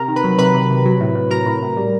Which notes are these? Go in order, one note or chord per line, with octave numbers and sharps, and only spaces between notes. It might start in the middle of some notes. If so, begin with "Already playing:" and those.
Already playing: C3 A#4 A#5
D#3
B4 B5
F#3
C3 B4 B5
C3
C3
F#3
A2
A2
F#3 A#4 A#5
A2
A2
G3